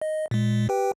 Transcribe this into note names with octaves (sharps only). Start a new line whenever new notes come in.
D#5
A#2 G#3
G4 B4 G5